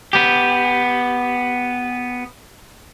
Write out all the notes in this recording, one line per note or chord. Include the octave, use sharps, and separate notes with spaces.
B3 G4